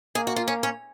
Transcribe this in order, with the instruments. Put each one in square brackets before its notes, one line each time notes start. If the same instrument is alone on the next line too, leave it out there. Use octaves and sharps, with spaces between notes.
[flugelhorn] A#3 [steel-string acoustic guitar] G#4
[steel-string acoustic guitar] F#4
F4
C#4
C#4